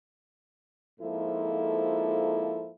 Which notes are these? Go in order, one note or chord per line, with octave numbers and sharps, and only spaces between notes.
F2 G#2 F3 A#3 E4 A4